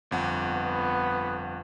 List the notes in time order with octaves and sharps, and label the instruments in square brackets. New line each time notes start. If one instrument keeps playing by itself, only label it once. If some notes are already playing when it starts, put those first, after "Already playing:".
[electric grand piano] G1 F2 F#5
[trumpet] B3